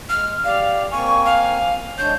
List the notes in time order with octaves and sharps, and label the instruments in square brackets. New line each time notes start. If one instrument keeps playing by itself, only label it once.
[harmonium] G#3 [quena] F6
[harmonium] G4 D5 [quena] F5
[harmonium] A#3 C4 G#5 [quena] C#6
[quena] F5
[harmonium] G#3 D4 C#5 [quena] G6